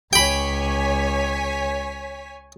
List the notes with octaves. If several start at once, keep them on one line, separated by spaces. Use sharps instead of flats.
C#2 C#5 G5 G#5 B5 B6